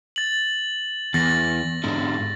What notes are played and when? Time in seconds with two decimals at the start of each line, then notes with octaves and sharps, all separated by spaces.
0.16 A6 F#7
1.14 E2 A6 A#6
1.84 G#2 D3